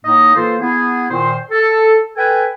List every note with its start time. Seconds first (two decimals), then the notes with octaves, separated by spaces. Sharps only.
0.05 A2 A#3 D#4 D#5
0.36 E3 A#3 F4 A4 C5
0.61 B3 E4 G#4
1.11 A#2 D#3 C5
1.51 A4
2.16 A4 B4 G5 G#5